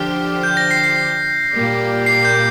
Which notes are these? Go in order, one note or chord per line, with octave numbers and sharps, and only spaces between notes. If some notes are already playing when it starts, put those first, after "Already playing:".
Already playing: D3 F3 D4 G4 C5 F6
G6
A#6
C7
C7
A#2 G3 A#3 G4 D5
C7
G6